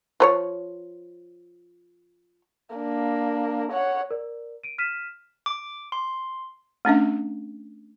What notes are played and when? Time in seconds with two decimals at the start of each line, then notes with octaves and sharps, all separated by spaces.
0.20 F3 B4 C#5
2.76 A#3 D4
3.72 C#5 F#5
4.11 A#4 D5
4.64 D7 D#7
4.78 F6 B6 D#7 E7
5.46 D6
5.92 C6
6.85 A3 C#4 D4 E5